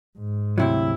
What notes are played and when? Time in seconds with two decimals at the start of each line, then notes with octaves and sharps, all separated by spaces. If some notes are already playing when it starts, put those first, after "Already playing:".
0.18 G#2
0.58 D2 C3 F#3 E4